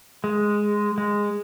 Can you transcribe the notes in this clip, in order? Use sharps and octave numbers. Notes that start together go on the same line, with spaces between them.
G#3
G#3